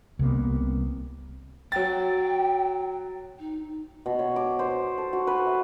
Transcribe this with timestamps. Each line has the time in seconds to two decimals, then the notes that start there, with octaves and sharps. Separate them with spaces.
0.19 C2 C3 A#3 B3
1.72 F#3 G5 A6
3.40 D#4
4.06 B2
4.19 C#5
4.36 D6
4.59 C5
4.98 A4
5.13 F#4
5.27 B4
5.47 E5